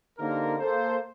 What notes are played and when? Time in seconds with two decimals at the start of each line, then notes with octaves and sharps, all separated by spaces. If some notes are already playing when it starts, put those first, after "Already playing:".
0.18 D3 A#3 C4 D#4 G4 A#4
0.59 A#3 A4 C5